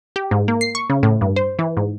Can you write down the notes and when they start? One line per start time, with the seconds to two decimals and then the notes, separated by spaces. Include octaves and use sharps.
0.16 G4
0.31 G#2
0.48 A#3
0.61 C7
0.75 C#6
0.90 C#3
1.03 A2
1.21 G2
1.36 C5
1.59 E3
1.77 G#2